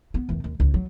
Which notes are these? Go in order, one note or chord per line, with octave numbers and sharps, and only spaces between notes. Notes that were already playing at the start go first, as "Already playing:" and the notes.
B3
E2 D#3
D#2
C#2
F#3